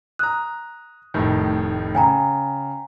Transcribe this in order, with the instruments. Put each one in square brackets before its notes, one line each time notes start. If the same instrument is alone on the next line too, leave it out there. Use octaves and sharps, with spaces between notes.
[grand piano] A#5 D#6 [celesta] F#6
[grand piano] F1 A2 D#3
[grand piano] C#3 [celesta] G5 G#5 A#5